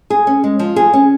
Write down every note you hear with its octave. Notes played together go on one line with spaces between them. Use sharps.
G#4
C#4
G#3
F3
G#4
C#4